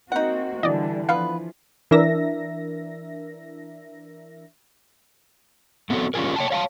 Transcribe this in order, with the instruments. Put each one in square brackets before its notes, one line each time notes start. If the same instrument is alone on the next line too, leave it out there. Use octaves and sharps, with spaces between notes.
[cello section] A#3 C4 F#4 [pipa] D#4 F#5
[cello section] D3 G3 [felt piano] E3 [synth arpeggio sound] D5 D#5
[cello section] F3 [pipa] B3 F4 B4 [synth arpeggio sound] F5
[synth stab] E3 D4 A#4 E5 A#6
[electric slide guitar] A3 B3 C4 F#4 A4
C#4 F4 G4 G#4 A#4
C#5 G5 A5
C#5 F5 G5 A5